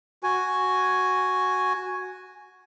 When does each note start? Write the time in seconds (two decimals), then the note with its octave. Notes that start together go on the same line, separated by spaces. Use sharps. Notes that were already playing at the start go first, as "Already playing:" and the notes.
0.23 F#4 G#5